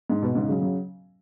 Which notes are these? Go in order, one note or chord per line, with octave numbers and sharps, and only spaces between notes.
G#2
B2
G#2 C#3
C#3 F#3
C#3 F#3